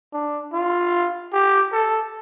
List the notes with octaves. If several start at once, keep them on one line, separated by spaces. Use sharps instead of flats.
D4
F4
G4
A4